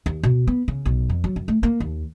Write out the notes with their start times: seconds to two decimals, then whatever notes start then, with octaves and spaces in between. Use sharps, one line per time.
0.06 D#2
0.23 B2
0.47 B3
0.68 C#3
0.86 B1
1.09 F2
1.24 F#3
1.36 F#2
1.48 A3
1.63 A#3
1.80 D#2